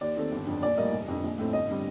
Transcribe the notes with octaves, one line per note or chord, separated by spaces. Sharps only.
D#2 D5
D#3 A3 C4
G1
F2 D3
A#1 D5
A2 G3 A#3 D#5
F1
F2 D3
A#1
A2 A3 C4
G1 D#5
D3 G3 C4